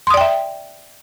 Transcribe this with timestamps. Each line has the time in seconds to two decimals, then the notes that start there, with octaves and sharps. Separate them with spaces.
0.07 C6
0.10 D#6
0.14 D5
0.17 G5
0.21 E5